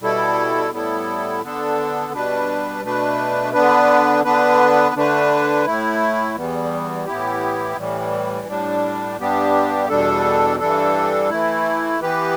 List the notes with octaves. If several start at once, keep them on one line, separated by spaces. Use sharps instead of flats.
B2 G3 E4 A4
A2 G3 B3 E4 A4
D3 B3 D4 A4
B2 G3 D4 B4
B2 A3 D4 B4
D3 B3 D4 B4
D3 B3 D4 B4
D3 A3 D4 B4
A2 A3 E4
E2 E3 G3 B3
A2 E3 B3 E4 G4
A2 E3 G3
A2 G3 D4
G2 G3 B3 D4 G4
E2 B2 G3 D4 A4
G2 E3 G3 D4 A4
E3 A3 E4
E3 B3 G4 B4